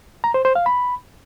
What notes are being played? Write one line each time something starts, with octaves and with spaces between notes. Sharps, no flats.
A#5
C5
C5
F5
B5